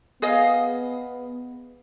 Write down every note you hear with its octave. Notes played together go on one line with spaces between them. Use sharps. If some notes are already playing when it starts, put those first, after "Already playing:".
B3 G#4 D#5 F5